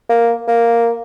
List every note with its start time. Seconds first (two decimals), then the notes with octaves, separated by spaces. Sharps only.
0.09 A#3
0.48 A#3